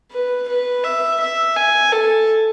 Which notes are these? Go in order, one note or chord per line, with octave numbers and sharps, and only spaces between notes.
B4
B4
E5
E5
G#5
A4